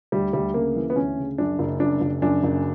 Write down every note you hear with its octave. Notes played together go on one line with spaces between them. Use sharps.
D2 G3
D2 G3
C#3 A#3
E3
B3
D2 C#4
C#3
F#2 D4
F#1
F#2 D4
F#1
F#2 D4
F#1